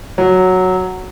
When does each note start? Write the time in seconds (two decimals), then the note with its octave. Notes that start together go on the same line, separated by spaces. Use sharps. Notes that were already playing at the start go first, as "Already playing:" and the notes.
0.18 F#3